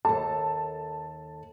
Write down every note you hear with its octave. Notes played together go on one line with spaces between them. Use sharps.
D#2 A4 A5